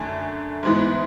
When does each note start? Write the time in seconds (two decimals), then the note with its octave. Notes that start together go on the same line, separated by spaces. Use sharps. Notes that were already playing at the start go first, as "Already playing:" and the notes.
Already playing: F#2 D3 A3 G#5
0.63 G#2 E3 G#3 B3